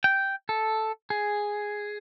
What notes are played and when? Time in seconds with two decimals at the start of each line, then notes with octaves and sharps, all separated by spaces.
0.04 G5
0.49 A4
1.10 G#4